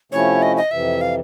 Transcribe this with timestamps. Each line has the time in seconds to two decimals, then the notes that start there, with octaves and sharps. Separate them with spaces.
0.12 C3 F3 A3 C#4 E4 C#5
0.42 D#5
0.57 D#5
0.71 F2 C3 E3 E5
1.01 F5